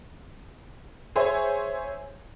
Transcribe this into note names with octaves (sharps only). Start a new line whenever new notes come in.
G#4 C5 C#5 E5 G#5